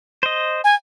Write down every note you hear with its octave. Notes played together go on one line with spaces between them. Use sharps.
C5 D#5
G#5